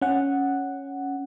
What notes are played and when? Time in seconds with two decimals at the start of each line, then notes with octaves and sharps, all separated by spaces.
0.02 C#4 F#5